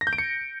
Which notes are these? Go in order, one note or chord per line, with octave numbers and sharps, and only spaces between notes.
A#6
G6
D7
C#7